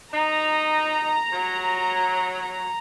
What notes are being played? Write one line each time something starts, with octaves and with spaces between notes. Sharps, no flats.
D#4 A#5
F#3